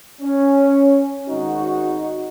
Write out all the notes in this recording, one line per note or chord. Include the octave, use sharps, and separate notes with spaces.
C#4
G#1 D#4 F#4